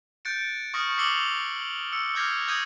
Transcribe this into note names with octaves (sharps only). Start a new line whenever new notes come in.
F#6 G6 A6 C#7 D7
C#6 D#6 F6 A#6 C#7
D6 E6 C7 C#7 F#7 G7
E6 C#7
D6 F6 G6 G#6 A#6 C7
D#6 G6 G#6 A#6 C#7 D#7